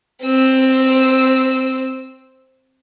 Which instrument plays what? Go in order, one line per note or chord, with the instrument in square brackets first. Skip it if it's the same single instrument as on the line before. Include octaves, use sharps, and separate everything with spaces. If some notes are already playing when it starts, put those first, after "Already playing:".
[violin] C4 E6